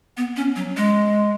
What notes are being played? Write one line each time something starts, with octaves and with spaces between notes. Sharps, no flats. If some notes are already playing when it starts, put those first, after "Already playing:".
B3
C#4
F#3
G#3